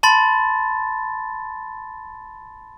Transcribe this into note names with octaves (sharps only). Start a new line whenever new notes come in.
A5 B5 C6 A6